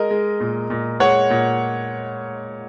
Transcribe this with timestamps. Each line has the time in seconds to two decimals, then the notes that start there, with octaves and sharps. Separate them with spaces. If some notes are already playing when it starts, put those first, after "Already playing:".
Already playing: G#3 A#4 D#5
0.10 G#3
0.40 A#2
0.70 A#2
1.00 G#3 C#5 F#5
1.30 A#2